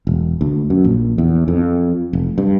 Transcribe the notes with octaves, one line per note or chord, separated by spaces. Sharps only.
E1
D2
F#2
A#1
E2
F2
F1
G2